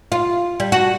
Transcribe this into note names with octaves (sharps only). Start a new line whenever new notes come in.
F4
G3
F#4